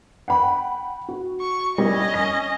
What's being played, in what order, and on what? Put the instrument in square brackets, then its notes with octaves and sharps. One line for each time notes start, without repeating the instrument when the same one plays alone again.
[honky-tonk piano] F#5 G5 B5
F#4
[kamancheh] C#6
[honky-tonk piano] G3 E4 [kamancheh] C#4 D#5
[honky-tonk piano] A#6